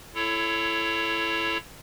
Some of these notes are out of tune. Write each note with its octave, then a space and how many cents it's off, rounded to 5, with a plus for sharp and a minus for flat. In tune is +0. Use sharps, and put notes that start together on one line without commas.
E4 +25 A4 +0 C#5 +0